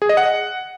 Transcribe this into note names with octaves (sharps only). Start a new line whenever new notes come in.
G#4
D#5
F#5